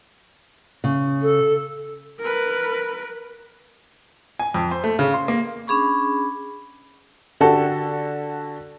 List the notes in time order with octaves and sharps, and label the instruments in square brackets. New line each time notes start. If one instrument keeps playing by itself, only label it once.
[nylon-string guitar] C#3
[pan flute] A4
[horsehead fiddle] A#4 B4
[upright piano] G#5
F2
C5
A3
C#3
C6
A#3
[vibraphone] C#4 D4 G#4 B5 C#6
[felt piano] D3 F#4 G4 A4